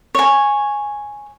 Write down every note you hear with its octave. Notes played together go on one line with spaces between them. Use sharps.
C#5 G#5